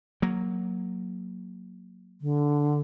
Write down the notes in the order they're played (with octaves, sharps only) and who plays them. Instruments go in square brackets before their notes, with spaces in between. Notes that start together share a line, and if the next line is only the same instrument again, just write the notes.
[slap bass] F#3 A#3
[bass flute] D3